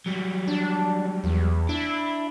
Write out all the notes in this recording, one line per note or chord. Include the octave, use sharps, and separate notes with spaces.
F#3 G3
D4
E2
D4 E4